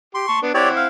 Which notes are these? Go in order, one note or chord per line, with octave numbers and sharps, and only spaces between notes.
G4 C6
A5 C#6
B3 D4
C4 E4 G4 C#5 D5 F#5
F5